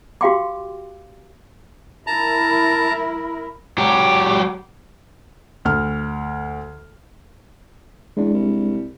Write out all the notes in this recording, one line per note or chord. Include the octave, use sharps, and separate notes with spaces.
F#4 G4 F5 G5 C6 D6
E4 A#4 A5 A#5
F#3 G4
D2 F6
E2 G#3 D4
C2